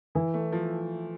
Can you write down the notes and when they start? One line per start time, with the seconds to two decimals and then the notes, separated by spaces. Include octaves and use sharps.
0.15 E3 E4
0.34 A3
0.52 F3